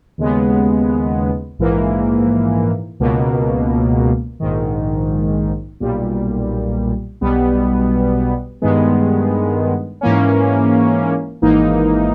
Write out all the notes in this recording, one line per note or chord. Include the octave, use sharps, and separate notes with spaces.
D#2 C#3 G#3 B3
A#1 G#2 E3 A#3
C#2 B2 A#3
A#1 G#2 D#3
B1 A#2 G3
B1 B2 G3 B3
G2 D#3 G#3 B3
G#2 E3 A#3 C#4
G#1 G#2 E3 A#3 D#4